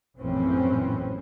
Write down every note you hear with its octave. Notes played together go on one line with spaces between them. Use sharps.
A#1 F#2 A2 E3 C4 C#4